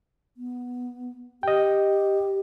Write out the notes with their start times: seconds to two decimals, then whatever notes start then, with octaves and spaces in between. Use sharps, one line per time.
0.37 B3
1.43 G4 D#5 G5